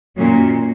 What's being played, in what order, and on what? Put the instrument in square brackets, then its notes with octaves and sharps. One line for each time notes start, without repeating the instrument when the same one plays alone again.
[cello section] F#2 D#3 F#3 A#3 C#4 [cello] A#2